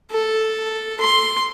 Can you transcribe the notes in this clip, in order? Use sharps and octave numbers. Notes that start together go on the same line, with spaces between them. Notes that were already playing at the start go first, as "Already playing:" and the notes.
A4
C6